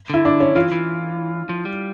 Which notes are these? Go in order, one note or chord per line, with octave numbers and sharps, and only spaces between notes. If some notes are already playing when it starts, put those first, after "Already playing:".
D3 E4
D4
C#4
E3 F4
E3
F3
G3